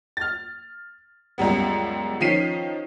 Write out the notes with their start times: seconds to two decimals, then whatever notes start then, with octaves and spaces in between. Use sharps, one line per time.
0.17 F6 A6
1.38 C#2 F#2 G3 B3
2.20 D#3 F3 C#4 B6 C7 D#7